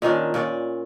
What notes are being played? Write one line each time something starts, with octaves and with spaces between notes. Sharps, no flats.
A#2 D#3 C#4 D4
A#2 C#4 D5